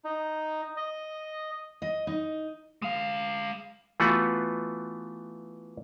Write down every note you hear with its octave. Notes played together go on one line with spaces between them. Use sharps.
D#4
D#5
D#5
D#4
G#3 F5
E3 A3 B3 F4 F#4 B4